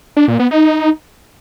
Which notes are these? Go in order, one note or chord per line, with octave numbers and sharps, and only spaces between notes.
D4
A#2
B3
D#4